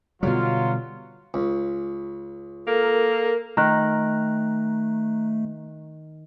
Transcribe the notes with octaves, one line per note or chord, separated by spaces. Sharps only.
B2 D3 F#3 G3 F4
C#2
A#3 A4 A#4
D#3 A3 A#5 F#6